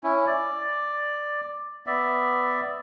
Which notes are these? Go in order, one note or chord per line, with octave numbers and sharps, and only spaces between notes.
C#4 E4
D5
B3 D5 E5